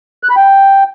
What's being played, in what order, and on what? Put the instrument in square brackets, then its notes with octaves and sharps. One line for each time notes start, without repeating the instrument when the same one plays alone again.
[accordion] F#6
B5
G5